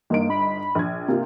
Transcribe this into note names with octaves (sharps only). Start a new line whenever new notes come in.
G1 A#3 D#4 D7
B5
A#1 G#6
C3 A#3 F4